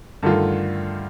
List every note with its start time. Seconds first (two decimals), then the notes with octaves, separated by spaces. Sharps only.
0.23 G2 D3 D#3 A3 F4